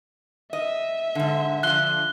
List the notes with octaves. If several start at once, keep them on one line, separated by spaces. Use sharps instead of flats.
D#5 E5
G#2 D3
D3 F3 F#6 G7